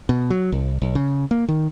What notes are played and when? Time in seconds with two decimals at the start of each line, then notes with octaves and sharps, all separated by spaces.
0.09 B2
0.30 F#3
0.52 C2
0.82 B1
0.95 C#3
1.31 A#3
1.48 D#3